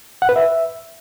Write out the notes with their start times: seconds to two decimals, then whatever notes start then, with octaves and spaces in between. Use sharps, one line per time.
0.22 F#5
0.29 B4
0.36 E5